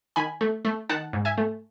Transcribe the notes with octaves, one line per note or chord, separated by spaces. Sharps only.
D#3 G#5 B5
A3
A3
D#3 F#5 A5
G#2
E5 G#5
A3